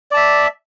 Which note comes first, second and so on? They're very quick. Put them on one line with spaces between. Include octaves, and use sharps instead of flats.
D5 A5 E5